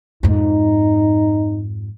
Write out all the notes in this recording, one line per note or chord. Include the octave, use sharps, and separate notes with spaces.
F2 G#2 D#4